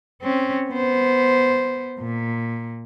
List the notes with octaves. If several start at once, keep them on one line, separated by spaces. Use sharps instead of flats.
C4 C#4
B3 C5
A#2